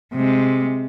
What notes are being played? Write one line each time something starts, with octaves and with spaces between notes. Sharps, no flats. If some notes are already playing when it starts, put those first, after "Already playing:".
C3 G#3